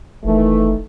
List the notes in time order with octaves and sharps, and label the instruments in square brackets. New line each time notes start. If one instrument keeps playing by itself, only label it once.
[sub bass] F1 [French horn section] D#3 E3 A3